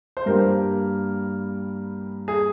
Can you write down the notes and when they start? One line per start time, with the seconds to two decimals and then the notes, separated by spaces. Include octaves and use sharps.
0.17 C5
0.26 G2 G3 A#3 A#4
2.28 G#4